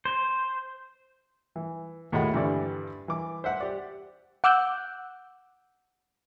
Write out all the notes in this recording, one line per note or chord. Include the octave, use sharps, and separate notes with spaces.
C5
E3
D#2 A2 G#3 F4 F#5 B5
G2 D3 E3 G3 D5
E3 D6
C5 E5 F#5
G4 D5
F#5 D6 E6 F#6 G6